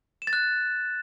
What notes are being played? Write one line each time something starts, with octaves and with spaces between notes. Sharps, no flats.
E7
A6
F#6